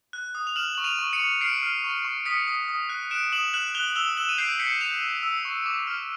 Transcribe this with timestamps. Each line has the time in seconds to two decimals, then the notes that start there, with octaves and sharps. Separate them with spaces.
0.13 F#6
0.35 D#6
0.47 F7
0.56 F6 E7 F#7
0.75 C#6 F#7
0.84 D#7 F7
0.99 C#6
1.13 C#7 D#7
1.20 C#6
1.41 F6 C7 D7
1.62 F6
1.84 C#6
2.05 C#6
2.26 D#6 B6 C#7
2.48 D#6
2.68 D#6
2.89 F#6
3.11 F#6 D7 E7
3.32 D#6 E7 F#7
3.53 F#6 E7 F#7
3.75 F#6 F7 G7
3.96 E6 F7 G7
4.17 E6 E7 F#7
4.29 D#7
4.38 G6 C7 D7
4.59 G6 B6 C#7
4.81 G6 D#7 F7
5.02 E6
5.23 E6
5.45 C#6
5.66 D6
5.87 F6